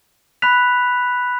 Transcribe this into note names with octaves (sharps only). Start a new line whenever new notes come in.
B5 F#6 B6 F7